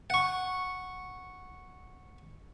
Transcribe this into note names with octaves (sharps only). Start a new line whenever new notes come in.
F#5 C#6